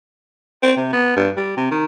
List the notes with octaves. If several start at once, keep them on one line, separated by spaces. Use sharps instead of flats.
C4
C3
B3
G2
G3
C3
D#3